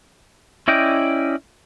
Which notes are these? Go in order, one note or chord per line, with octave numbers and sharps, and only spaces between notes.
C#4 E4 D5 D#5 G5